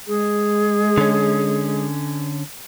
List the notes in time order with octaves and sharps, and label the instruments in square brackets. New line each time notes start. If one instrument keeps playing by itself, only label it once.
[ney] G#3 [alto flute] G#4
[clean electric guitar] D3 C#4